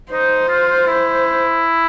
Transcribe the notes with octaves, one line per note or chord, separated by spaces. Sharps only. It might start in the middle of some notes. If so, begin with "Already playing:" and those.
D#4 C5
F4
E4